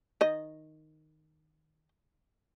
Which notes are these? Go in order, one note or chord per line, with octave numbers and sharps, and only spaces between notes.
D#3 D#5